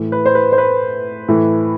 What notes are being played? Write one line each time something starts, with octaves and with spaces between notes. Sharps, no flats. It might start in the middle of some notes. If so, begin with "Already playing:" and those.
Already playing: A2 E3
B4
C5
B4
C5
B4
A2 E3